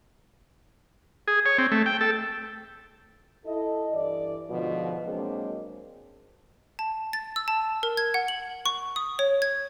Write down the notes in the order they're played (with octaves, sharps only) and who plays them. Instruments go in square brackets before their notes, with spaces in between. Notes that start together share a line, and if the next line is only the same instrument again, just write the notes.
[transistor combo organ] G#4
C#5
C4
A3
G5
A4
[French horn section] E4 A4 D#5
G2 E3 A4 D5
G#2 B2 D3 F3
F#3 G#3 A#3 C4 D4 G#4
[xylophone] A5
A6
E6
A5
A#4
G#6
F#5
F#7
C#6
D#6
C#5
G#6